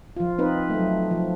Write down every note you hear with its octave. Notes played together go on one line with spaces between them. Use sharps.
F3 F4
C4 D#4 B4
F#3 A3
F3